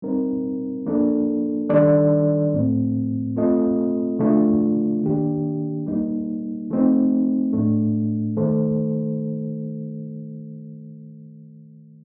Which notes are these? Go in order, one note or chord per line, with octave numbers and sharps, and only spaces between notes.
G3 C4 D#4 A#4
F3 A#3 D4 A4
D#3 G3 D4 A4 D5
A2 F3 A3 C4
A3 C4 F4 A4 D#5
D3 F3 A3 D4 F4
D#3 A#3 D4 G4
G3 A#3 D#4
F3 A3 C4 D#4
A2 A3 D4
D#3 A3 D#4 A4 C5